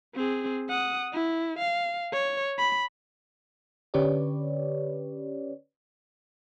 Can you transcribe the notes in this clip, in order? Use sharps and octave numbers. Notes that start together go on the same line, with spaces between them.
C4 G#4
F#5 D#6
E4
F5
C#5
B5
D3 C#4 G4 B4 C#5 D5